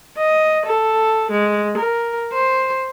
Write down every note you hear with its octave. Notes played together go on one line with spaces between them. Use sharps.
D#5
A4
G#3
A#4
C5